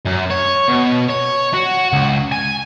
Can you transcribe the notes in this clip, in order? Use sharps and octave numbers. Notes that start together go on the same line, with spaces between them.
F#2
C#5
B2
C#5
F#4
C#2
G#5